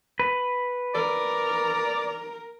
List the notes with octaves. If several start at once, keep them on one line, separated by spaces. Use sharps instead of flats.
B4
A#4 D5